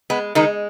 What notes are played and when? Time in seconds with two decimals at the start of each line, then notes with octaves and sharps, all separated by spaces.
0.10 G#3 B3
0.35 D#3 G#3 D#4